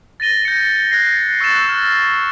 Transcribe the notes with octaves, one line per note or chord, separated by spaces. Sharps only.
A6 A#6 D#7 G7
G6 A#6 C#7
F#6 G#6 A#6 C7
C#6 E6 F#6 A6 D#7 E7
E6 F6